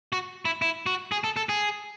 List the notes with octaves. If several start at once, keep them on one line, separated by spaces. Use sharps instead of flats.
F#4
E4
E4
F#4
G#4
A4
A4
G#4